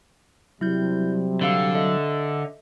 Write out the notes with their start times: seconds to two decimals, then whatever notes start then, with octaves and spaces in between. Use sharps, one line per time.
0.61 C3 F#3 G3 E4 G6
1.41 D3 C4 F5 E6
1.75 A4 D#5 E5